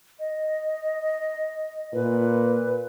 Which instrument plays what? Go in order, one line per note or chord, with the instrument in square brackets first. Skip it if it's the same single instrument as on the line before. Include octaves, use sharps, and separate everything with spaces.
[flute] D#5
[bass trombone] A#2 [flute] B4